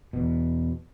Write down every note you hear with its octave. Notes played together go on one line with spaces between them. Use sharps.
E2 B2